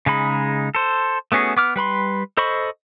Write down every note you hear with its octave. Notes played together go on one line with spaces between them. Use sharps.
C#3 G#3 D#4 B5
A4 C5
A3 B3 C#4 F#4 G#4
B3 D6 F6
G3 B4 B5 C6
A4 C5 D#5 B5 C#6